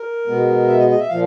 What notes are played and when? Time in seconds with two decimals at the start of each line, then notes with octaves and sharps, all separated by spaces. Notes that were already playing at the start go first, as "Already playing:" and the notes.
Already playing: A#4
0.27 B2 G#3 B3
0.67 E5
0.79 D#5
0.89 D#5
0.99 E5
1.09 A#2 F3 F5